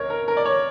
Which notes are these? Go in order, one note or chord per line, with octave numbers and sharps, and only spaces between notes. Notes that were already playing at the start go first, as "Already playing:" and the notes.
Already playing: C#2 A#4 C#5
A#4
A#4
D5
C#5